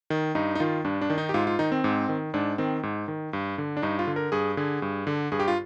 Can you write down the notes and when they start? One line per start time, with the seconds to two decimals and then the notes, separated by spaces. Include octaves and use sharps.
0.10 D#3
0.35 G2 D#4
0.55 D#4
0.60 D#3 F4
0.85 G2 D4
1.01 D4
1.10 D#3
1.18 D#4
1.29 G4
1.34 G#2 F4
1.47 F4
1.59 D#3 D#4
1.72 C4
1.84 G#2
2.09 D#3
2.34 G#2 D4
2.58 D#3 C4
2.83 G#2
3.08 D#3
3.33 G2
3.58 D3
3.77 D4
3.82 G2 D#4
3.99 F4
4.07 D3
4.16 A#4
4.32 G2 G#4
4.57 D3 G#4
4.82 G2
5.07 D3
5.32 G2 G#4
5.40 G4
5.48 F4